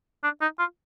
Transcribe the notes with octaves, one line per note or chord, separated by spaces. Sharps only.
D4
D#4
F4